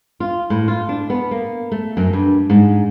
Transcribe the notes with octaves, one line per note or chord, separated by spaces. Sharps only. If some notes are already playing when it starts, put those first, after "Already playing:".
F4
A2
F4
D4
B3
A#3
A3
F#2
G2
G#2